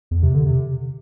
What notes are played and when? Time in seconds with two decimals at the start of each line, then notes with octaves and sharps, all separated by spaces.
0.11 E2
0.23 C3
0.34 D3
0.46 C3